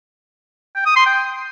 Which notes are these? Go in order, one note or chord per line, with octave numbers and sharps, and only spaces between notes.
G5
D#6
C6
G5